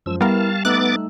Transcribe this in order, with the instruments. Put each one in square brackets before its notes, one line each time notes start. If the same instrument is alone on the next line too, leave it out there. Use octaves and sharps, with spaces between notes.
[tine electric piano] F#2 F3 G#3 [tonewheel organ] E6
[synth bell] G3 [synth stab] B3 A#4 [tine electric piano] E4 [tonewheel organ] F5 A5
[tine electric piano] A3 D#4 E6 [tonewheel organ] B3 D6 A6 [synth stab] F#6